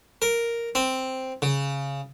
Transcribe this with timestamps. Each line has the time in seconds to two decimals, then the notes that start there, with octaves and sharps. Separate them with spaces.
0.22 A#4
0.75 C4
1.42 C#3